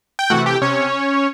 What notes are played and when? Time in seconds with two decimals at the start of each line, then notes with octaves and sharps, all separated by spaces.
0.19 G5
0.30 C3 E3 A3 F#4 F#5
0.46 G4 G5
0.62 C3 C#4 C#5